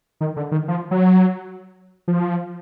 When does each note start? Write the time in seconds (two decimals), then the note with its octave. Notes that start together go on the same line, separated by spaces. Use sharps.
0.21 D#3
0.37 D3
0.52 D#3
0.68 F3
0.91 F#3
2.08 F3